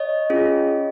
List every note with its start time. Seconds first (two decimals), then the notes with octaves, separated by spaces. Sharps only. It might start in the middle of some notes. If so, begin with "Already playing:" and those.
Already playing: C#5 D#5
0.30 C#4 F4 G#4